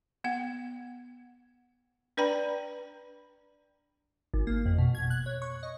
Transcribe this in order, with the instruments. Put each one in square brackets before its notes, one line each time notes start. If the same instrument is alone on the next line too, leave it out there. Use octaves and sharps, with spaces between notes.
[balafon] B3 F#5
D4 B4 D5 G5 A#5 B5
[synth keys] G#1
A#3
F2
B2
G#6
F#6
C#5
C#6
D#5